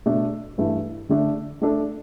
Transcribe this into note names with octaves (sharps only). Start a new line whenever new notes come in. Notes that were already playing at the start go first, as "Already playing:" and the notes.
B2 A3 D4
G2 E3 A3
D3 A3 D4
A3 D4 A4